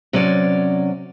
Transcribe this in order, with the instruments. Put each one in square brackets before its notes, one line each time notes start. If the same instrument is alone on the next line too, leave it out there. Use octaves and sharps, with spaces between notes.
[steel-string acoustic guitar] C3 F#3 C#4 D5